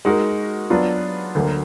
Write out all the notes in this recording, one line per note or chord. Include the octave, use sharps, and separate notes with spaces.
G#3 D#4 F#4 A#4
F#3 B3 D4 F4
D2 D3 F#3 A#3